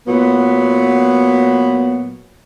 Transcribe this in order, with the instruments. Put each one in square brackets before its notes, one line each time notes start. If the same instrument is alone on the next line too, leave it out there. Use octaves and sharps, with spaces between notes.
[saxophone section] A#2 F#3 B3